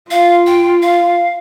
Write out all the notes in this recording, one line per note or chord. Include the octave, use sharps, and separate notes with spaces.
F4 F5
G5
F5